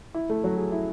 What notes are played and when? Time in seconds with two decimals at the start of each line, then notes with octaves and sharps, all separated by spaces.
0.14 E4
0.29 A3
0.44 F#3
0.58 G#4
0.72 E4